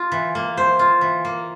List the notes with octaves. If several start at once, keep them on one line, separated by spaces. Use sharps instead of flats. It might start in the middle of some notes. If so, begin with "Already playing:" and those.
Already playing: F4
E3
A#3
C5
F4
E3
A#3